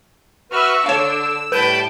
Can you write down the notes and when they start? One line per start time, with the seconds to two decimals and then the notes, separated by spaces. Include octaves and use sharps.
0.52 F#4 B4 E5 C#6 F6
0.86 D3 D4 C#5 F5 E6
1.52 A2 G3 B4 G5 A5 B5 G6 D#7